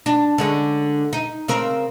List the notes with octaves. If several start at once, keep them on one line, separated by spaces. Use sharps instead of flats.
D4
D3 G#3 C#4
D#4
C#3 C4 A#4